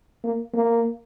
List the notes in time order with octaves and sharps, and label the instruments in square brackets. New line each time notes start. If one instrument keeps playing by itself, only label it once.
[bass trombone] A#3
A#3